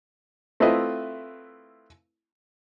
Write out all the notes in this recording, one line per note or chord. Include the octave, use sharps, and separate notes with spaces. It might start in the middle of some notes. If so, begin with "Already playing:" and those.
A3 C4 E4 F4 B4 D#5